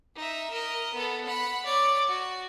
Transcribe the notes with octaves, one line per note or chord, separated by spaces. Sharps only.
D#4 E5
A#4 D#5
B3 A4
F#5 B5
C#5 D5
F#4